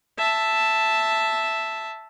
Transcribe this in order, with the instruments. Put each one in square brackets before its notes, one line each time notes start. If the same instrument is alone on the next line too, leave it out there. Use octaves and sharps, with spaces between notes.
[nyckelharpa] E5 A5